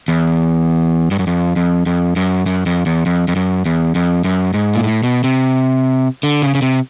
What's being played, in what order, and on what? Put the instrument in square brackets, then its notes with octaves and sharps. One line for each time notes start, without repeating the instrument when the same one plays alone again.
[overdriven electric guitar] E2
G2
F#2
F2
F2
F2
F#2
F#2
F2
E2
F2
F2
F#2
E2
F2
F#2
G#2
A#2
A2
B2
C3
D3
C#3
C#3
C3